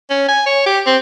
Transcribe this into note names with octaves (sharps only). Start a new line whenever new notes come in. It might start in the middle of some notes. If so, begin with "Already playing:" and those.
C#4
G#5
C#5
G4
C4